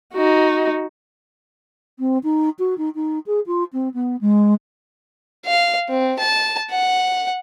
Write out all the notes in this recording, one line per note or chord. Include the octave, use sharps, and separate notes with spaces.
D#4 F#4
C4
D#4
F#4
D#4
D#4
G#4
F4
C4
B3
G#3
F5
C4
A5
F#5